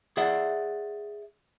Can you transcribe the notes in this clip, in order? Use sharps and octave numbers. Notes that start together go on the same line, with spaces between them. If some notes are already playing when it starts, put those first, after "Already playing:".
G#4 D5 E5 F#5